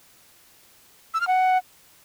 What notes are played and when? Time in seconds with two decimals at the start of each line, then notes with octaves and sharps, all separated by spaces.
1.14 E6
1.21 F6
1.27 F#5